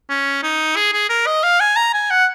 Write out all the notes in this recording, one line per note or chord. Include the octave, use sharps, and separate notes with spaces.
C#4
D#4
G#4
G#4
A#4
D#5
F5
G#5
A#5
G#5
F#5